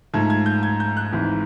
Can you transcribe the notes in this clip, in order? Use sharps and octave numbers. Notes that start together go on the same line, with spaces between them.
G#2 F3 A3 G#6
G#6
G6
G#6
G6
F#6
G#1 G#2 E3